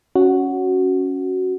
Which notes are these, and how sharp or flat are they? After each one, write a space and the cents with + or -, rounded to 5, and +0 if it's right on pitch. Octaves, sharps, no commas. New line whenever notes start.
C#4 +0 F#4 +0